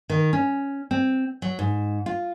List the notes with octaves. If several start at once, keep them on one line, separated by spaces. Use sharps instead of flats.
D#3
C#4
C4
F#3
G#2
F4